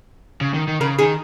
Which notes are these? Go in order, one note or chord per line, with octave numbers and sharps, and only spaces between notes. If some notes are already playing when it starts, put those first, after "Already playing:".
C#3
D#3
D#3
C#3 A#4
D#3 G#4